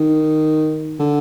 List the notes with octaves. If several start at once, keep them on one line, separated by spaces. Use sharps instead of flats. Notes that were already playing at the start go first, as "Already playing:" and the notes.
Already playing: D#3
D3